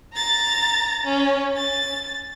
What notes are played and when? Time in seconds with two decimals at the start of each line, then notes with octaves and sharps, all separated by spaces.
0.13 A#5 A6
1.04 C#4
1.57 A6